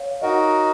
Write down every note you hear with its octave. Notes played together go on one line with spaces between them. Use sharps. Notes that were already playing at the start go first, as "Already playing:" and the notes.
Already playing: C#5 F5
D#4 F#4 A#4 D#5 F#5